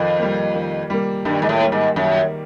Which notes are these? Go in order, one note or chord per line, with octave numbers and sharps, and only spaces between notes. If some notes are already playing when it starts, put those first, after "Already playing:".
Already playing: F2 D#3
G3 A#3
D#3
G3 A#3
G2 D#3
G#2
A2
G3 A#3
G#2
F#2 D#3